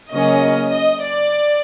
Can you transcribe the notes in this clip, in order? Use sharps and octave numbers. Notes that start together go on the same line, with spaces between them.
C#3 F#3 A#3 C#4 D#5
D#5
D5